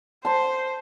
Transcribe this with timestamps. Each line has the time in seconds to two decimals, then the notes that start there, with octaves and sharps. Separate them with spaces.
0.25 C5 A5 C6